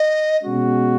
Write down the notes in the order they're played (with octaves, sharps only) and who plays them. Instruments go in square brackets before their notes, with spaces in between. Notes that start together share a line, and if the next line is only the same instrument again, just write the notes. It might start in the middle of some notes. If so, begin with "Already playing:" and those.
Already playing: [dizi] D#5
[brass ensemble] B2 G#3 C#4 F#4